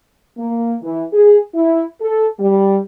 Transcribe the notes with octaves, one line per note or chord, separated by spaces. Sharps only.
A#3
E3
G#4
E4
A4
G3